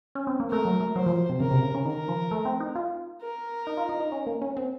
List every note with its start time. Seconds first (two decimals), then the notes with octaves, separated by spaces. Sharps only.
0.15 C#4
0.27 C4
0.40 A#3
0.50 A3 A#4
0.65 F#3
0.80 A3
0.96 F#3 C5
1.06 F3
1.30 C3
1.40 C#3 A#4
1.51 C3
1.63 C#3
1.75 C#3
1.85 D#3 A#4
2.08 F3
2.31 A3
2.45 C4
2.60 D#4
2.75 F4
3.22 A#4
3.67 D#4
3.77 F4
3.89 D#4
4.00 D#4
4.12 C#4
4.27 A#3
4.42 C#4
4.57 C4